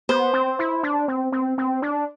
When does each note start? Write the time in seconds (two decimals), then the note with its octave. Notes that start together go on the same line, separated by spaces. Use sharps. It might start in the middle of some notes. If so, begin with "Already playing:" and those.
0.09 B3 C5
0.33 C4
0.59 E4
0.83 D4
1.08 C4
1.32 C4
1.58 C4
1.82 D4